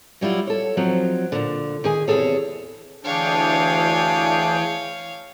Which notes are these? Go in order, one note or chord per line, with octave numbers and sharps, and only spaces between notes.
F#3 G3 E4 F4
A4 C#5
F3 F#3 C4 D#4
A#2 D3
D#3 G#4 G#5
E2 C3 G#3 G#4 A4 C#5
D2 E3 D4 G#4 C#5 F5 G5